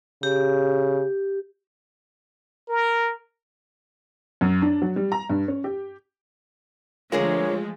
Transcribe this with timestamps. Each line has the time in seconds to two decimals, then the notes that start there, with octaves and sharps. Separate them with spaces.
0.23 C#3 G4
2.69 A#4
4.41 F#2
4.62 D4
4.82 F#3
4.96 G3
5.12 A#5
5.30 G2
5.48 C#4
5.64 G4
7.12 D3 F3 G#3 A3 F4 G#4 A#4 C#5